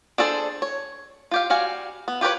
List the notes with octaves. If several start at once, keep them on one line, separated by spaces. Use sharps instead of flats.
D4 G#4 A4 C5
C#5
F4 G4 F5
G3 F#4 F5 G#5
B3
F4 G4 A#4 B4 C#5